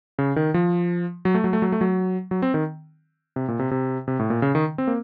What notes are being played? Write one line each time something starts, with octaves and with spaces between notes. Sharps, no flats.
C#3
D#3
F3
F#3
A3
F#3
A3
F#3
A3
F#3
F#3
C4
D#3
C3
A#2
C3
C3
C3
A2
A#2
C#3
D#3
C4
A#3